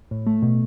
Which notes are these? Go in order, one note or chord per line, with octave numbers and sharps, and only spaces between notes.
A2
A3
B2